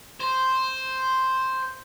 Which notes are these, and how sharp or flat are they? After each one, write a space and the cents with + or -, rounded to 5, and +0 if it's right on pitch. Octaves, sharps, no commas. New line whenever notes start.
C5 +0